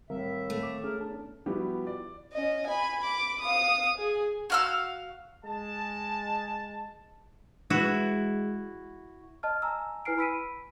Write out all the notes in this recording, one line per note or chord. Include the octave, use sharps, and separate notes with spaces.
A2 D#3 G3 C4 A#4 E5 F5
A3
D6
C#4 G#4 A#4
E2 D4 A5
F3 G3 B3 E4 F#4 G4
D5
C#4 D#5
G#5 B5
B5 D6
F5 D#6
G#4
F#4 F5 E6
G#3 A5
G#3 E4 F#4
D#5 A5 F6
G#5 A#5 E6
E4 B4 G#5 F6 C7 D7
B5 E6 B6 D7 D#7